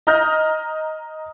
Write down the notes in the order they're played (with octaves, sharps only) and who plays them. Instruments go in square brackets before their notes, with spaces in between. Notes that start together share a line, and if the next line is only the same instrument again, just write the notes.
[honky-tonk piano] D#5 A#5 D#6 F6 G6 A#6